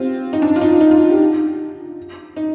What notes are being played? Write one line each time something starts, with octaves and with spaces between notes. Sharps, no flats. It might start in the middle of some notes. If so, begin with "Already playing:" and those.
Already playing: C4 F4 G4
D#4
D4
F4
D#4
D#4
F4
G4
D#4